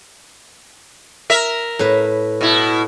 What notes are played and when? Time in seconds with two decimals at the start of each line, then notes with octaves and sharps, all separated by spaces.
1.30 A#4 E5
1.79 A2 B4
2.41 B2 E4